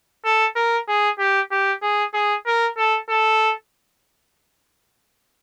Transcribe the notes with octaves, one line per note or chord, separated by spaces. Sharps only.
A4
A#4
G#4
G4
G4
G#4
G#4
A#4
A4
A4